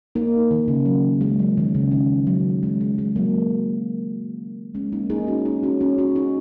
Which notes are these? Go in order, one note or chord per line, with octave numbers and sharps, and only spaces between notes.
A#3 D#4
D#3
C#3
F#3
G#3
F#3
D#3
C#3
D#3
F#3
G#3
G#3
G#3
F#3 A#3
G#3 C#4
A#3 D#4
D#4 G#4
C#4 F#4
D#4 G#4
C#4 F#4
C#4 F#4
C#4 F#4
D#4 G#4